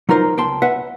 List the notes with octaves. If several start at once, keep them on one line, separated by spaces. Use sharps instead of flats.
F#3 D#4 F4 A#4 C5
C#2 G5 A5 C6
B4 E5 F#5